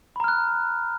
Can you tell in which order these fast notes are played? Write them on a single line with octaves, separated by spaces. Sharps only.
B5 A#5 F6 F#6